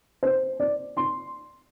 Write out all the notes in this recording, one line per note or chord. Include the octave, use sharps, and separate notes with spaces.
C5
D5
C6